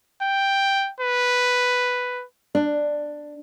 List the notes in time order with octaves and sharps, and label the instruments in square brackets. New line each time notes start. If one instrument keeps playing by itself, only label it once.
[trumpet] G5
B4
[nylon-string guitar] D4